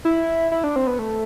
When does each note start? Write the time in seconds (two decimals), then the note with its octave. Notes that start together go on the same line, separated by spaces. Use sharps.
0.05 E4
0.52 E4
0.64 D4
0.76 C4
0.87 B3
0.99 A3